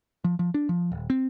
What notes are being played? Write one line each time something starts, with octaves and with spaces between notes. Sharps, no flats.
F3
F3
D4
F3
D#1
C4